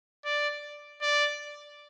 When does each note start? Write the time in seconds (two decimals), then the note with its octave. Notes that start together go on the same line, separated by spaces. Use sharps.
0.25 D5
1.02 D5